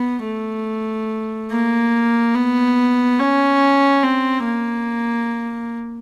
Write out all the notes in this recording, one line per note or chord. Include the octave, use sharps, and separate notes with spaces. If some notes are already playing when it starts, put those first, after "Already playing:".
Already playing: B3
A3
A#3
B3
C#4
C4
A#3